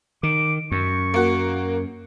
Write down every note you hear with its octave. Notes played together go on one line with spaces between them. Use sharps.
D#3 D6
F#2 C#6
A#3 F#4